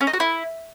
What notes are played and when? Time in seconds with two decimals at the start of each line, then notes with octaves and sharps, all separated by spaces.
0.01 C#4
0.07 D#4
0.13 F#4
0.20 E4